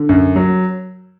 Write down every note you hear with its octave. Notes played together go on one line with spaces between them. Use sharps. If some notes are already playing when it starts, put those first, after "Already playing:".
Already playing: D3
F#2
F#3